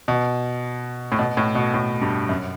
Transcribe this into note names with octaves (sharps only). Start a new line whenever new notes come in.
B2
A2
B2
A2
B2
A2
G2
F#2